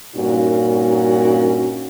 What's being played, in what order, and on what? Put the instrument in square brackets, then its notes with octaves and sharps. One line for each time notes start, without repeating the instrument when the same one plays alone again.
[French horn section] G2 A#2 C#4 D#4 F#4